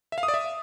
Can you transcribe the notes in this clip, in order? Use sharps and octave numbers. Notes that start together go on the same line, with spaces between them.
E5
F5
D#6
D5
E5